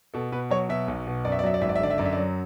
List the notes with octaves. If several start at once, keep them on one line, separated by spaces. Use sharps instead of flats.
B2 A4
B2 B4
F#3 C#5
B2 E5
B1
B2
F#2 D5
E5
D5
F#3 E5
D5
G#1 E5
D5
E5
D3 D5
E5
F#2 D5
E5
D5
F#3